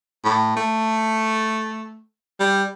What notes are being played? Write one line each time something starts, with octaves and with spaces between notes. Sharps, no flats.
A2
A3
G3